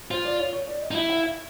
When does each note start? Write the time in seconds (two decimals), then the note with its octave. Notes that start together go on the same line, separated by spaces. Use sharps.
0.11 F4 C5
0.25 D5
0.39 C#5
0.53 C#5
0.68 D5
0.81 D#5
0.91 D#4
0.95 E4 E5
1.10 F5
1.23 E5